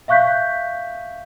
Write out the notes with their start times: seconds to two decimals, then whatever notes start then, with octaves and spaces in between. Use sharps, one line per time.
0.08 E5 F5 C#6 F#6 G6 B6